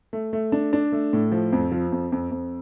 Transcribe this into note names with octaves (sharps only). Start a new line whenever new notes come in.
A3
A3
D4
D4
A3
A2
F3
F2
F3
F2
F2
F2